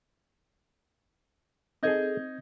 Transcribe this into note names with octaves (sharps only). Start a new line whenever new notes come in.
C4 D#4 G#4 A4 D#5 G#5 G6 G#6